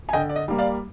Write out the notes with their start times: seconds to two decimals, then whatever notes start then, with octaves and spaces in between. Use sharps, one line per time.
0.09 G#5
0.13 D3 D#5 G5
0.29 D5
0.36 D#5
0.48 G3 A#3
0.58 D5 F5